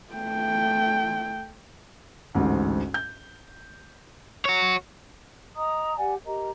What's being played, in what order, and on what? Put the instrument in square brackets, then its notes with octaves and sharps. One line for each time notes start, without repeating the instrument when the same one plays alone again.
[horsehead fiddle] A3 G5
[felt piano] A1 D2 G#2
G6
[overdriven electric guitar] F#4 C#5
[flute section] D#5 A#5 D#6
G4 D5 F#5 G#5
G4 A#4 D#5 A#5